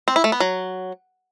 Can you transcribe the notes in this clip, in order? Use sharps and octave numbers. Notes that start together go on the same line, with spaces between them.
C4
E4
A3
B3
F#3